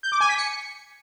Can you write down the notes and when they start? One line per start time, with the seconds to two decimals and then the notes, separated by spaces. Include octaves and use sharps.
0.03 G6
0.12 D6
0.21 G#5
0.29 B6
0.38 C#7